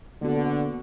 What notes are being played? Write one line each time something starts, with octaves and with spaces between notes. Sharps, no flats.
D3 A#3 B3 F#4